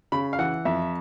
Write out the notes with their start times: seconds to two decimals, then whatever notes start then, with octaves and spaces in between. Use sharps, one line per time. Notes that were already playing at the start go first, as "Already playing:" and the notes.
0.12 C#3 B5
0.33 F5
0.39 E3 F#5
0.65 F2 E5